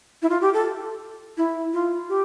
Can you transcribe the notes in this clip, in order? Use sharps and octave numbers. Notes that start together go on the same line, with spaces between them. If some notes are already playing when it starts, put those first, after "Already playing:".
E4
F4
G4
A4
E4
F4
G4